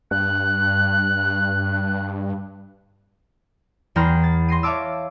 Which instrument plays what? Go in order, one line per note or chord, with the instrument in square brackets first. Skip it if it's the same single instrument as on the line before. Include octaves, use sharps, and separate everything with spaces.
[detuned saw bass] G2 [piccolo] F#6
[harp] E2 B3 G5 A#5 C6 F6
A6
C6 A#6 C7 D#7
C#5 E5 F5 A5 D6 E6